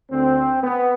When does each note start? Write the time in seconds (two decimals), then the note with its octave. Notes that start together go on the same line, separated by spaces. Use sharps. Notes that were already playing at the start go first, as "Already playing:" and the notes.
0.11 D2 D3 C4
0.61 B3